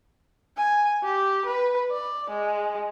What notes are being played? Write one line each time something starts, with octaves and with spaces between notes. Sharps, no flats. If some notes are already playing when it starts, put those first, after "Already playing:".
G#5
G4
B4
D5
G#3